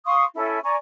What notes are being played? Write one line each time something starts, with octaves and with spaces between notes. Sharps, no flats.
F5 C6 C#6 D#6
C#4 E4 A4
D5 G#5 A#5 C#6